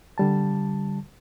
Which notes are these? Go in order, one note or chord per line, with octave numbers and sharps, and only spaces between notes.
D3 G3 A5